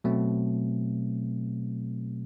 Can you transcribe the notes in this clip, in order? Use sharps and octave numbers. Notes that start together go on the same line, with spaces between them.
B2 F#3 A3 C4